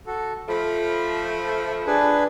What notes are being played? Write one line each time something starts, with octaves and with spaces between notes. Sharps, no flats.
F#4 A4
F3 A3 B5
D4 G#4 B4